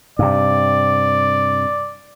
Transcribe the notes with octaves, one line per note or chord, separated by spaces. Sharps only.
G2 C3 D5